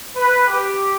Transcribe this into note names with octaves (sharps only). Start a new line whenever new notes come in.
B4
G4